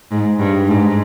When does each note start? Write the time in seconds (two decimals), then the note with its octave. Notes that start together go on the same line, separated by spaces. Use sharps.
0.11 G#2
0.39 G2
0.67 G#2